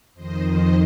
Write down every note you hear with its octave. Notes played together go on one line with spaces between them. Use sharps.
F2 D#3 C5 D#5
C5 D#5